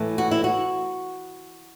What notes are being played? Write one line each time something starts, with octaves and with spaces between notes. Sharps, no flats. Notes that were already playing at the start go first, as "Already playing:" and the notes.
Already playing: A2 E3 A3
F#4
E4
F#4